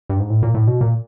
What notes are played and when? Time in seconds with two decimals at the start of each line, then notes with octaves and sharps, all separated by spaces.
0.10 G2
0.19 G#2
0.30 A2
0.43 A#2
0.54 A2
0.67 B2
0.81 A#2